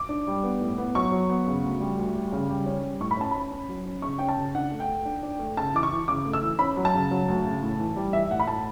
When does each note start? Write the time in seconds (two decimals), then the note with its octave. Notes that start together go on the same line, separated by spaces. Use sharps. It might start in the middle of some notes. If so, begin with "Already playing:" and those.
Already playing: D6
0.09 D4
0.27 G3
0.44 B3
0.61 A2
0.78 B3
0.95 F#3 C#6
1.12 F#3
1.30 B3
1.47 C#3
1.64 D2
1.80 G3
1.98 D2
2.15 G3
2.32 C#3
2.49 G3
2.66 C#4
2.83 G3
3.00 A2 C#6
3.11 B5
3.17 C#4 A5
3.31 C#4 B5
3.51 C#4
3.69 F#3
3.86 C#4
4.02 C#3 C#6
4.19 C#4 G5
4.29 A5
4.37 C#3
4.55 D4 F#5
4.72 A3
4.80 G5
4.88 A3
5.05 D4
5.23 D4
5.39 A3
5.57 C#3 A5
5.74 E3 D6
5.83 C#6
5.92 E3
6.08 C#3 D6
6.25 A3
6.33 E6
6.42 E3
6.59 C#4 B5
6.77 F#3
6.85 A5
6.94 C#3
7.11 F#3
7.28 D2
7.44 C#3
7.63 A2
7.80 E3
7.96 G3
8.13 E3 E5
8.31 A2 F#5
8.40 B5
8.47 A2 A5